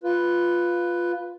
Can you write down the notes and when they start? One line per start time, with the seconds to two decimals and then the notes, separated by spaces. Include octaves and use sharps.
0.04 F4 B4